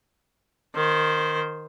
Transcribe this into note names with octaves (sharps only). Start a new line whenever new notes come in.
D#3 C5